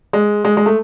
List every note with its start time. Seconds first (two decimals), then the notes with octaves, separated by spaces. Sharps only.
0.13 G#3
0.45 G#3
0.57 G#3
0.66 A3